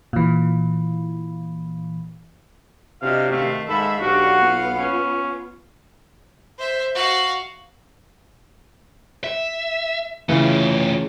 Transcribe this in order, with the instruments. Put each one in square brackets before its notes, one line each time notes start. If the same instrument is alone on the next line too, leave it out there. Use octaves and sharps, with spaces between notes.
[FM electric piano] A#2 E3
[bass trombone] C3 [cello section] D4 F#4 D#5 [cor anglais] F5
[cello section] D#3 F5 [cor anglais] A3
[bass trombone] G#2 [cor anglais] A4 [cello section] E5 F5 [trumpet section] B5
[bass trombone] B1 [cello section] D4 G4 [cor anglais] F#4 [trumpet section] B4 F5 F#5
[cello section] B3 F4
[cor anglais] C#4
[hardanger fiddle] C5 E5
F#4 F5
[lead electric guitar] E5
[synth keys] C#3 E3 [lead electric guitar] A3 F4